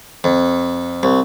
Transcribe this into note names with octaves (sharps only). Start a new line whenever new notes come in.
F2
C2